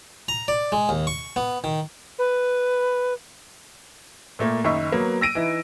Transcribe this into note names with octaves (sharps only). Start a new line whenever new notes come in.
A#5
D5
G#3
D#2
C#6
B3
D#3
B4
A#2 A3 A#3
F#1 D#3 D#5 E5 C#6
F#3 A#3 B3
E6 A#6 D7 D#7
E3 D#4 E4